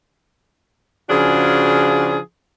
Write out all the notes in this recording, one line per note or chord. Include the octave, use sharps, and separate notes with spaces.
C#3 F3 D4 F#4 G#4